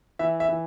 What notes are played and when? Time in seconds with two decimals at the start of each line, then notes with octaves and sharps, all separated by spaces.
0.19 E3 E5
0.40 E5
0.49 E3